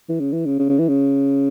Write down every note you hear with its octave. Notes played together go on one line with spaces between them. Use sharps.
E3
C#3
E3
C#3
C#3
C#3
E3
C#3